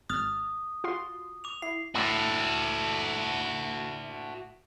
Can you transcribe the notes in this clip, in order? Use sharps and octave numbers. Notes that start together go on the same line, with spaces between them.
G#1 D#6 F6 A6
F4 F#4 C6
D6 F7
E4 C7
A2 F#4 A4